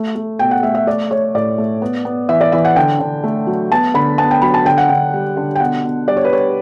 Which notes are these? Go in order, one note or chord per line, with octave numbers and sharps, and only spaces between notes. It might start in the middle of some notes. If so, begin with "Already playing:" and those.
Already playing: A3
A3
B2 G5
F#5
A3 E5
E5
A3 D5
A3 C#5
A2 D5
A3
B3
B3
E3 E5
D5
E3 E5
F#5
D3 G5
D3
A3
F#3
B3 A5
D3 B5
B3 A5
G5
F#3 B5
A5
D3 G5
F#5
D3 G5
G3
D3
G5
B2 F#5
B2
G3 D5
C#5
B4
G3 C#5